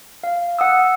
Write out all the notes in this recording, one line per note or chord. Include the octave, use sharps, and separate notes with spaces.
F5
F#5 D#6 E6